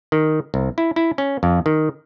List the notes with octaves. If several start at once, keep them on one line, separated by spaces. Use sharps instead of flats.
D#3
C2
E4
E4
C#4
F2
D#3